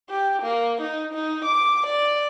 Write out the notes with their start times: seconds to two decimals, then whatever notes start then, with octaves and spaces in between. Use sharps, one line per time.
0.10 G4
0.43 A#3
0.82 D#4
1.14 D#4
1.45 D6
1.87 D5